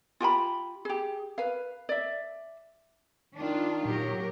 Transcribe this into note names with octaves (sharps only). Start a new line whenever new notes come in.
F4 G4 G5 B5
G4 G#4
B4 F5
D5 E5
D#3 D4 F4
A#2 F#3 G4 A#4